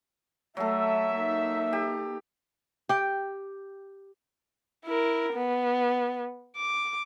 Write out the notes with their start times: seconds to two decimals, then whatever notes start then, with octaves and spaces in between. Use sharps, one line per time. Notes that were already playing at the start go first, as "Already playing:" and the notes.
0.57 F#3 A3 A4 E5
1.13 A#3 D#4
1.73 G4
2.89 G4 G5
4.85 E4 A#4
5.34 B3
6.57 D6